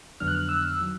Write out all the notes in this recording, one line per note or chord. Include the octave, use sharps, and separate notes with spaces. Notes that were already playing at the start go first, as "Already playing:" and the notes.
F2 D3 F#3 B3 D4 F6
F#6
F6
E6
D#3 F#3